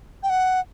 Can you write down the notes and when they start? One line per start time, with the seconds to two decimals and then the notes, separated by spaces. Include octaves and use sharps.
0.23 G5
0.30 F#5